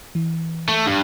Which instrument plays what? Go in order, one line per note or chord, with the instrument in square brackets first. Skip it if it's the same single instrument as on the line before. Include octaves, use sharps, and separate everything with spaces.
[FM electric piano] E3
[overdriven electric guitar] A3
G2